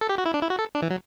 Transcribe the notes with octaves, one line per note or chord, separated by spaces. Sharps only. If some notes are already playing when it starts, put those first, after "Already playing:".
A4
G4
F#4
E4
D4
E4
F#4
A4
D4
E3
F#3